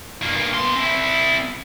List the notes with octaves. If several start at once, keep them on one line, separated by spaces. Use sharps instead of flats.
G2 A#3
B2 C6
C4 E4